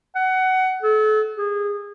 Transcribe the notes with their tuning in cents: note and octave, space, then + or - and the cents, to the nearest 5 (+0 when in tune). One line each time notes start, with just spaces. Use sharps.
F#5 +20
A4 -35
G#4 -25